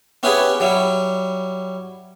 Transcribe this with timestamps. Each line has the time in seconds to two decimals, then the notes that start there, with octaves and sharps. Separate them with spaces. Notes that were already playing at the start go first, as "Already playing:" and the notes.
0.23 B3 C#4 E4 G4 G#4 B4
0.60 F#3 G3 E4